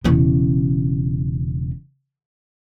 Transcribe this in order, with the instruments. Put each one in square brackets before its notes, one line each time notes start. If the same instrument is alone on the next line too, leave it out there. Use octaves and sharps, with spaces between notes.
[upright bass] E1 C#3